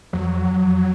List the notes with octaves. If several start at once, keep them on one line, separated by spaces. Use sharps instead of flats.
F2 F#3
F2